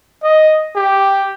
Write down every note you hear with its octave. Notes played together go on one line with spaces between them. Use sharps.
D#5
G4